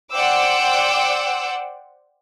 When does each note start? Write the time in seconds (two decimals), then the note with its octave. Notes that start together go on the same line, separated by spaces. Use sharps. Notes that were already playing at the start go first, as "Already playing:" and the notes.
0.12 C5 D5 F#5 G5 D6 E6